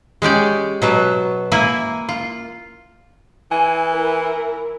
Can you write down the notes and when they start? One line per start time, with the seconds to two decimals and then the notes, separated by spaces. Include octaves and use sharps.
0.22 G#3 C#4 G4 D5
0.82 B2 F#3 B3
1.52 A#3 E4 G#5
2.09 F4
3.51 E3 G#5
3.91 E4 A#4